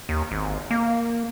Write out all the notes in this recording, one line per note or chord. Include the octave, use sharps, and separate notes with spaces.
D#2
G#1
A#3